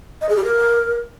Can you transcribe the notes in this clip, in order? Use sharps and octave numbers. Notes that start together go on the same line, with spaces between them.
D#5
G#4
G4
A#4